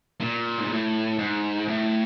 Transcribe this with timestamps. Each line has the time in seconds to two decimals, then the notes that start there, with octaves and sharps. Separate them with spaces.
0.21 A#2
0.58 G#2
0.70 A2
1.19 G#2
1.68 A2